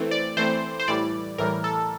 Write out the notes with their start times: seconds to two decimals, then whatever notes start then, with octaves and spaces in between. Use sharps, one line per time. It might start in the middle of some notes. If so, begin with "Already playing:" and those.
Already playing: E3 A3 C4
0.11 D5
0.37 E3 A3 C4 C5
0.79 C5
0.88 A2 E3 G3 D5
1.38 A2 E3 G3 A#4
1.64 A4